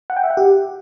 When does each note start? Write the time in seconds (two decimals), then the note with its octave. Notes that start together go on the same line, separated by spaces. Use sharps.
0.10 F#5
0.17 G5
0.23 E5
0.30 F#5
0.37 G4